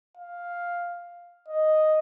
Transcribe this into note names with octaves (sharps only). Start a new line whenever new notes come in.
F5
D#5